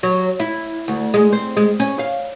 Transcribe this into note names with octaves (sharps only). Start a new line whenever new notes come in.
F#3
E4
D2
G#3
C4
G#3
C#4
F5